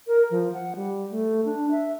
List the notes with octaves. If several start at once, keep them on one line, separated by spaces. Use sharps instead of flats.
A#4
F3
F#5
G3
A3
D4
E5